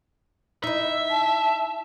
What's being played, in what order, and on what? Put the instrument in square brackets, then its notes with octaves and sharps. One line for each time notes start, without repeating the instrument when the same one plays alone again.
[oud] D#4 E4 [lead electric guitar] E5
[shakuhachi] A5